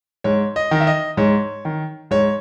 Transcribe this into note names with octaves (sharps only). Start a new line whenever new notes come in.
G#2 C#5
D#5
D#3
E5
D#5
G#2 C#5
D#3
G#2 C#5